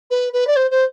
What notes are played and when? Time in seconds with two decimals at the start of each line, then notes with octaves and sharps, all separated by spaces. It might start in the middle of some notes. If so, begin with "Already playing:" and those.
0.11 B4
0.33 B4
0.47 D5
0.56 C5
0.71 C5